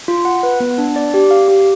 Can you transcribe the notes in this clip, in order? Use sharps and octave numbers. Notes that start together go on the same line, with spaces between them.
F4
F#5
B4
B3
D4
D5
G4
F5
G4